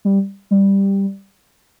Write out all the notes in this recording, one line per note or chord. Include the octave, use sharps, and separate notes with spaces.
G3
G3